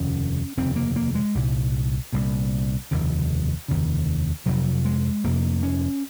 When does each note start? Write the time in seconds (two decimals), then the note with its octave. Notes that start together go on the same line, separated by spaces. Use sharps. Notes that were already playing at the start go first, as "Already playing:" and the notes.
Already playing: F1 D#2 C#3 C#4
0.57 F1 D#2 C#3 C4
0.76 A#3
0.96 A#3
1.15 G#3
1.35 C2 A#2
2.13 C2 A#2
2.91 F1 D#2 C#3
3.68 F1 D#2 C#3
4.46 F1 F2 C3 F#3
4.85 G#3
5.24 F1 F2 C3 A#3
5.63 C#4